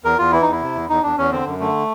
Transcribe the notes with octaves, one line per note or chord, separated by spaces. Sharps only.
E2 A#4
E2 F4
E3 E4
D#4
E2
E4
C3
E2
E2 D#4
E2 D4
E2 C#4
D3 C4
F#2
D3 A3